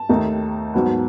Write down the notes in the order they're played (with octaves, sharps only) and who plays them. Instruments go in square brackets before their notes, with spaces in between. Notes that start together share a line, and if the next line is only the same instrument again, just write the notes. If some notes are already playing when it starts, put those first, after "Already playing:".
Already playing: [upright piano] A5
D#2 D#3 A3 D#4
G#2 F#3 B3